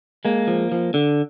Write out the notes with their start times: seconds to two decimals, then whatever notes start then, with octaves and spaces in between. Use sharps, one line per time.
0.25 G#3 A#3
0.47 F3
0.72 F3
0.94 D3